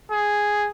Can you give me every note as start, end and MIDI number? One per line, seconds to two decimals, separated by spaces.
0.11 0.69 68